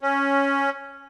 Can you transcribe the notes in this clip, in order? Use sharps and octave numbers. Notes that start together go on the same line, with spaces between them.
C#4